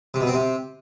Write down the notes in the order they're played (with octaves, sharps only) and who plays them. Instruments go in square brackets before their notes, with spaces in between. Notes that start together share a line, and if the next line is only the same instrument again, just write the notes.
[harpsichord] C3
B2
C4
C3